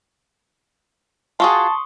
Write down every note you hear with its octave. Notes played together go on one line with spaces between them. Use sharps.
F4 F#4 G#4 A5 C6 C#6 D#6